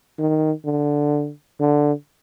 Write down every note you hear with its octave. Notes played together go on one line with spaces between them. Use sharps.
D#3
D3
D3